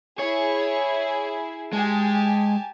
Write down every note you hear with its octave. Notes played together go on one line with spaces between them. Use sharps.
E4 G#4 C#5
G#3 G4 G#5 A5